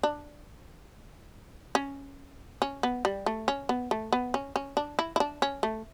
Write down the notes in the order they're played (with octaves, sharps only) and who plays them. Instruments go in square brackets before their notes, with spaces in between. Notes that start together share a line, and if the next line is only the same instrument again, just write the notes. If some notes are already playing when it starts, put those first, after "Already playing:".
[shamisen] D4
C#4
C#4
B3
G3
A3
C#4
B3
A3
B3
C#4
C#4
D4
E4
E4
D4
C#4
A3